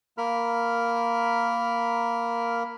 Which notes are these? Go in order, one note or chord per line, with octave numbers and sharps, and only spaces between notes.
A#3 A#4 B5 F6